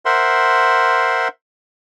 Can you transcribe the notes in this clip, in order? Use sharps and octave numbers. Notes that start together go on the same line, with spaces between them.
A#4 C5 E5 F#5 C6